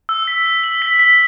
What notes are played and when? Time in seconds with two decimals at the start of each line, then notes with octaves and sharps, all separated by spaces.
0.09 E6
0.28 B6
0.46 B6
0.64 F#7
0.82 B6
0.99 B6